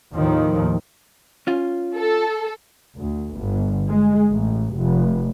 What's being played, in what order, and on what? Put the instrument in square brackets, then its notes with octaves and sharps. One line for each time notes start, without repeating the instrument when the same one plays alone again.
[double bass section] D#2 A2 D#3 F3
[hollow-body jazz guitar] C#4 F4
[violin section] A4
[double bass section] D2
G1
G#3
A1
F1